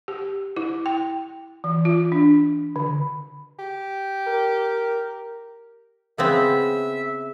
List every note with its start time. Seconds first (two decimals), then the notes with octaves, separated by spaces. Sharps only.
0.08 G4
0.57 E4
0.86 G5
1.64 E3
1.85 F4
2.12 D4
2.76 D3
3.59 G4
4.26 A#4
6.18 C#3 B3 C4 E5